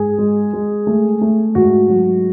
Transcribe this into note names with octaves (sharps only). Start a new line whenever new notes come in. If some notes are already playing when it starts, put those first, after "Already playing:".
Already playing: G#2 G#4
G#3
G#3
A3
A3
G#2 F#4
F#3